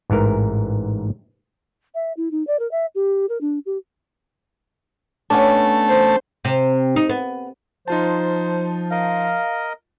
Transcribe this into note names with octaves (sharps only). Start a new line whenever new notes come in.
A1 G#2 E3 A#4
E5
E4
D#4
D5
A#4
E5
G4
A#4
D4
G4
A3 B3 C#4 D4
C5
C3
D#4
B3
F3 D#4 F4 C5 A5
A#4 D#5 F5